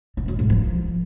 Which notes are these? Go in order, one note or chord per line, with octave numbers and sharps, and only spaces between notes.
E3
F#2
G#2
F3